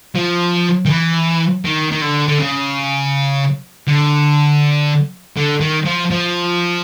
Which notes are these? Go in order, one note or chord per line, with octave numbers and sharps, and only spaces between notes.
F3
D#3
E3
D#3
D#3
D3
D3
C#3
D3
D3
D#3
F3
F3